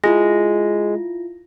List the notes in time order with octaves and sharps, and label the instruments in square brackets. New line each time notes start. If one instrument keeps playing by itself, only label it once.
[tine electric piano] G#3 [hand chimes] E4 F4 A#6